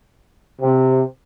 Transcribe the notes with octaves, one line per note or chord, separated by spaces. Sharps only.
C3